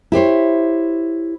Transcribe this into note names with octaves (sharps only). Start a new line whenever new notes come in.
E4 G4 C5 C#5